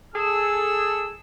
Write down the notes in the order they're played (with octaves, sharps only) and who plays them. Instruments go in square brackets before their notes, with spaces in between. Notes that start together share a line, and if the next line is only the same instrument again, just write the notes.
[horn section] G#4 A4 [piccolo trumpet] E6